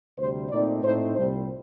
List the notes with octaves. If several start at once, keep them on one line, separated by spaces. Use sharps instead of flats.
D2 C3 G3 C5
A#2 A3 C4 D#4 D5
A2 A3 C4 D#4 C5
C2 A#2 G3 C5